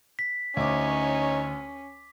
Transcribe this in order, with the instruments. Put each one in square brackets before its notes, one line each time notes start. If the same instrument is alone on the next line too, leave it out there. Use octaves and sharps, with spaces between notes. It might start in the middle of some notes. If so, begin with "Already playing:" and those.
[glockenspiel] B6
[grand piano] D2 D6 [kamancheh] C#4 [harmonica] D#4 C#5